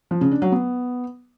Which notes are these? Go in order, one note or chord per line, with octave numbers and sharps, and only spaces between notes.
F3
C#3
D4
F#3
B3